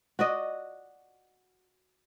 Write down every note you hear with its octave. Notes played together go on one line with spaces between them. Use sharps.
F#4 D5 D#5